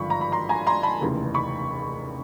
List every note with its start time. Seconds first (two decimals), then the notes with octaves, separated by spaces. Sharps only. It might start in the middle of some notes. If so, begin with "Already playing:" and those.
Already playing: G#1 G2 D3 F3 B5 C#6
0.10 A#5
0.21 B5
0.32 A#5 C6
0.49 G#5 A#5
0.67 A#5 C6
0.83 A5 B5
1.01 F1 D#2 C#3 E3
1.34 B5 C#6